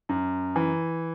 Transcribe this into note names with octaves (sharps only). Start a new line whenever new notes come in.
F#2
E3